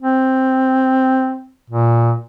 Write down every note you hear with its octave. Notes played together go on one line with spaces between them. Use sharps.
C4
A#2